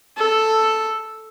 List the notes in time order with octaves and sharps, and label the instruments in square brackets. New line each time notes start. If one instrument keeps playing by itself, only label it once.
[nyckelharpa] A4